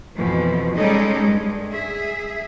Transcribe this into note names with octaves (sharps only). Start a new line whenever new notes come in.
F2 B2 E3 F3
G3 G#3 C#4 D#4 A4 D#5
G2 G#3
G#4 E5